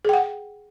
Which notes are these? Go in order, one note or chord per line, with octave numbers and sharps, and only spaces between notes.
G#4 F#5 G5